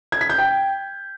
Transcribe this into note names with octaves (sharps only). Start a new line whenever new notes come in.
G#6
B6
G6
G5